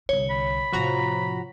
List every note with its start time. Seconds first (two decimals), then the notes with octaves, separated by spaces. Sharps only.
0.09 C2 D3 C#5
0.30 B5
0.73 A2 C3 F3 F#4 A#5